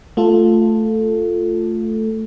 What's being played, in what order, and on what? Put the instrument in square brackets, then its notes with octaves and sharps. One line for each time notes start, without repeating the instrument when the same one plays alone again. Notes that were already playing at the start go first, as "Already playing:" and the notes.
[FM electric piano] A3 F4 A4